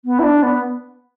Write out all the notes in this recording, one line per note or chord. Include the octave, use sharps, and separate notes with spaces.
B3
E4
D4
B3